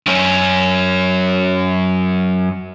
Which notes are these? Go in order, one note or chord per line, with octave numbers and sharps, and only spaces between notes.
F#2 C#4